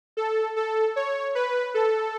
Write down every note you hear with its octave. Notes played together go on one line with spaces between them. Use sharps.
A4
A4
C#5
B4
A4